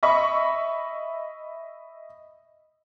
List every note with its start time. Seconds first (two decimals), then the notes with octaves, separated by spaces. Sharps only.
0.03 D#5 E5 B5 C#6